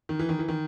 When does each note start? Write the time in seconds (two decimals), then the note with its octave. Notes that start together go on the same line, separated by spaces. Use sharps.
0.09 D#3
0.19 E3
0.29 D#3
0.39 E3
0.48 D#3